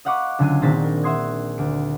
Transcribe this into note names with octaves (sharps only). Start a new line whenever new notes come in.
D#5 F5 F#5 B5 C#6 D6
C#2 D3 F#3 G#5 D#7
A#1 D#3 C4 A#5 A6 B6
A#4
E5 F#5 C6 D#6 G#6
D2 D7